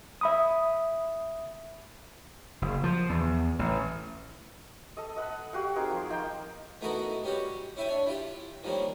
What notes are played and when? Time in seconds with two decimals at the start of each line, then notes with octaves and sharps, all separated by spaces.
0.21 E5 B5 D#6
2.62 F#1
2.84 F3
3.09 E2
3.59 A1
4.97 A4 D#5
5.16 D#5 F#5 B5
5.53 F#4 G4 F5 F#5
5.75 C4 D#4 G#4 A#4
5.91 F3
6.10 F3 A#3 D#4 G5
6.81 A3 B3 D#4 E4 F#4 A#4
7.24 G3 C#4 F#4 G4
7.77 C#4 E4 E5 G5 G#5
7.88 D4 C#5
8.06 E4 F4 G4
8.63 D#3 F3 G3 A#3 C#4